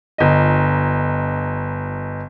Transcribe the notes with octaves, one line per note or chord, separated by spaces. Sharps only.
G1 D#5